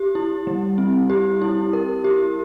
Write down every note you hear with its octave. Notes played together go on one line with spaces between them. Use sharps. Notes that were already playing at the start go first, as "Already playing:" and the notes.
Already playing: G4
E4
G3
C4
G4
E4
A#4
G4